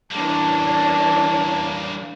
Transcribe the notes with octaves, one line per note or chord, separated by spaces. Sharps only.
E3 G3 A#3 C#4 D4 A5